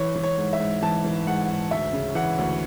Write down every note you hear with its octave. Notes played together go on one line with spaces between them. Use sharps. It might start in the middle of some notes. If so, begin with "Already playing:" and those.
Already playing: E3 C#5
E3
C#5
G#2
E5
G#2
E3 A5
E3
G#2 F#5
G#2
D2 E5
C#3
E3 F#5
D2